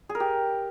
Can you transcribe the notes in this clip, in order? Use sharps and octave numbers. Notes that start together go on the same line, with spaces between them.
G#4
A#4
G4